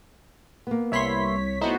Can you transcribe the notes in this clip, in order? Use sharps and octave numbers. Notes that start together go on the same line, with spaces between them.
A#3 B3
C2 C#5 E5 B5 C6 B6
A3 B3 D#4 E4 F#4 C5